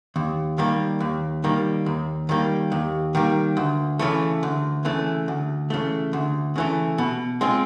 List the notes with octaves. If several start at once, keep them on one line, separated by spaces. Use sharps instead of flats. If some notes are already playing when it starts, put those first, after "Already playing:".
D#2
D#3 G3 A#3
D#2
D#3 G3 A#3
D#2
D#3 G3 A#3
D#2
D#3 G3 A#3
D2
C#3 E3 A3
D2
C#3 E3 A3
D2
C#3 E3 A3
D2
C#3 E3 A3
B2
G#3 C4 F4